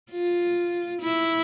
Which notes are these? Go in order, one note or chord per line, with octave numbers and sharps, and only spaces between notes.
F4
E4